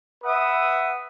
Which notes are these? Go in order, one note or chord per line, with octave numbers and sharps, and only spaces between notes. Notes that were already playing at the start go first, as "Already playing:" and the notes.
B4 E5 F#5 D#6